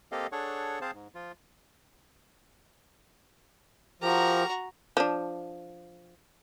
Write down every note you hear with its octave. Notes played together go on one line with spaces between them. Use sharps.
A#3 C4 G4 A4 D#5 F5
D4 G#4 A4 C#5 F#5 C#6
C4 G#4 C5 F5 A5
G#2
F3 F4
F3 F#4 G4 A#4 A#5
F3 D4